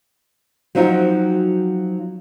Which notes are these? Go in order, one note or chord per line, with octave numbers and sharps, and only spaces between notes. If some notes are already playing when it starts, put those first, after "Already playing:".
F3 F#3 C4 D#4 F4 F#4